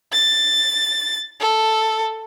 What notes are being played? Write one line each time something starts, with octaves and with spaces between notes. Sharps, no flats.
A6
A4